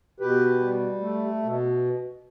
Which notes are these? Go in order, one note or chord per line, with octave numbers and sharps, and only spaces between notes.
B2 G4 B4
G3
A3
B2